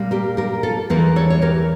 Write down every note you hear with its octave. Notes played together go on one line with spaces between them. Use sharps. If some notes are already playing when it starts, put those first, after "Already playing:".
Already playing: A#2 G3 A#3
G4 A#4
G4 A#4
F4 A4
E2 E3 A#3 F4 A4
A4 C#5
C#5
G4 A#4